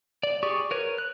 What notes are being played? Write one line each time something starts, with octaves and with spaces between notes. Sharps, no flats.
D5
G4 G#4 D5 C#6
A#4 B4 C#5
F#6